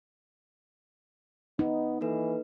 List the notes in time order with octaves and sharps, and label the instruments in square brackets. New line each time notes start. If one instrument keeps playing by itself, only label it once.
[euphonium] B3 [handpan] D#4
[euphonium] E3 [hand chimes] A#3 A4 B4